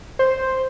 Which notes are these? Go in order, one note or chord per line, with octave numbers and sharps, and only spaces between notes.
C5